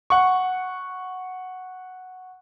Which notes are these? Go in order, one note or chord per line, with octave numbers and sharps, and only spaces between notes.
F#5 C#6